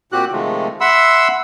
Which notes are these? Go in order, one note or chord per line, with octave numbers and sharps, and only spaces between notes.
A#2 C4 F#4 G4 F#6
C3 D#3 F3 G#3 A3
E5 F#5 B5 C6 E6